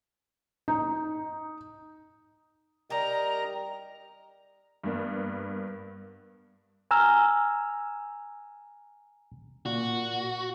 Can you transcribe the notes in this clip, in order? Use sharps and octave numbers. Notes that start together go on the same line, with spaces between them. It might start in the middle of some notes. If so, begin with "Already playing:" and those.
D#4
G3 G4 A#4 D#5 A#5
G2 A#3 B3
G#5 A#5 E6 F6
A#2 F#4